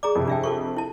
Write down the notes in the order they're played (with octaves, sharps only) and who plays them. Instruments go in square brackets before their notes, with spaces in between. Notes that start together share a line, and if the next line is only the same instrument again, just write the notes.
[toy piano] G#4 A#5 D6 [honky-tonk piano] D5
[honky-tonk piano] F2 C3
[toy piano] D4 E5 G5
F4 A4 C#6
E4 A5